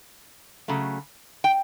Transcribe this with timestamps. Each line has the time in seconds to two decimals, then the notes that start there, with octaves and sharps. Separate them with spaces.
0.68 C#3 F#3 A3
1.44 G5